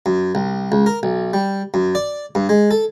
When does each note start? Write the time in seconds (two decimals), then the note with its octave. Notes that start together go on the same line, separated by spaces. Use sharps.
0.06 F#2
0.35 C2
0.72 C#2
0.86 A#4
1.03 B1
1.33 G3
1.74 F#2
1.95 D5
2.35 G2
2.49 G#3
2.71 A4